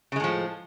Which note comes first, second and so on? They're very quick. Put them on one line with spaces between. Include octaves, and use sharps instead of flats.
C#3 G#3 A2 F3